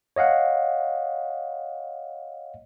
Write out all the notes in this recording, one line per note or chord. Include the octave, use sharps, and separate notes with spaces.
C#5 D#5 F5 F#5